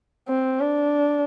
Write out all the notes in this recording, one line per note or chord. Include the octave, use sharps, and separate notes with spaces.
C4
D4